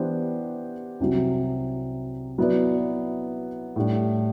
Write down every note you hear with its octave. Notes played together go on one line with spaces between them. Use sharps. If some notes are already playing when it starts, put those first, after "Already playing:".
Already playing: E3 B3 D4 G4 C5
C2 C3 F#3
F#3 B3 E4 B4 D5
A2 G3 D4